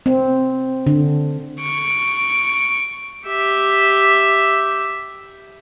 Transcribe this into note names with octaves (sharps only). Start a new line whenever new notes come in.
C4
D3
C#6 D7
G4 E5